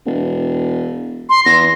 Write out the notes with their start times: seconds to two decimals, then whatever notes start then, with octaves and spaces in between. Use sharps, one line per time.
0.06 E1
1.30 C6
1.46 E2 A#6